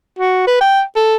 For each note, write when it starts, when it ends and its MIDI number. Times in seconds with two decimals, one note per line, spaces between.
0.19 0.45 66
0.47 0.57 71
0.61 0.82 79
0.96 1.16 69